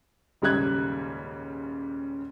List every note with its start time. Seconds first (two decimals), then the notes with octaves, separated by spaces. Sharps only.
0.42 D#1 G#2 C#3 G3 F#6 G#6